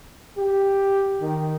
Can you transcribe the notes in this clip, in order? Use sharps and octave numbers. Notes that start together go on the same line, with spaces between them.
G4
D#3